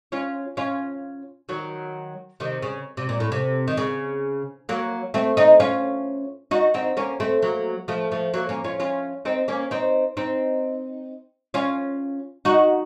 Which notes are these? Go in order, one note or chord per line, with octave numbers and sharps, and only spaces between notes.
C#4 F4
C#4 F4
D#3 F#3
C3 D#3
C#3
C3
A#2
A2
C3
D#3
C#3
F#3 A#3
A3 C4
C4 D#4
C#4 F4
D#4 F#4
C4 D#4
A#3 C#4
A3 C4
F#3 A#3
F3 A3
F3 A3
F#3 A#3
A#3 C#4
C#4 F4
C#4 F4
C4 D#4
A#3 C#4
C4 D#4
C4 D#4
C#4 F4
D#4 F#4